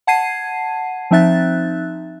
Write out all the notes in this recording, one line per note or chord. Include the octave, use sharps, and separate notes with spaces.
F#5 A5 G#6 C7 D#7
F3 C4 D#4 E5 F#6 A6